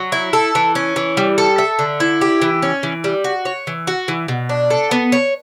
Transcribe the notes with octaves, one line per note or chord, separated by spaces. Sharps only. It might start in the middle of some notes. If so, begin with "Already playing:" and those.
Already playing: F#3
E4
A4
E3
C#4
E3
G3
A4
E5
D3
E4
G4
E3
C#4
E3
G3
F#4
C#5
E3
F#4
E3
B2
D4
A4
B3
C#5